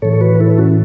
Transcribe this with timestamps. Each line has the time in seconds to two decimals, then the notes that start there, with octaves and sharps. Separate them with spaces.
0.02 A2 E3 A4 C#5
0.13 A4
0.21 F#4 B4
0.40 E4 A4
0.58 C#4 F#4